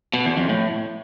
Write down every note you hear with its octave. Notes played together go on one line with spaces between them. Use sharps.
B2
E2
F2
A2